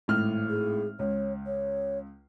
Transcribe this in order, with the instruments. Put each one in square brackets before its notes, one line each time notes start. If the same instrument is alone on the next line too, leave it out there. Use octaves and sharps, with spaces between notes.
[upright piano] G#1 A2 F6
[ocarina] G#4
[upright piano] C#2 [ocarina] C#5
[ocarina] C#5